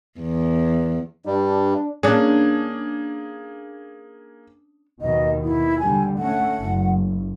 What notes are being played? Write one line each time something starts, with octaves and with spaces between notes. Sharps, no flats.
E2
G2 G3 D4
A#3 C#4 D4 G#4
D#2 B2 D#3 D#5
E4
D3 G3 G#5
A3 C#4 F#5
F#1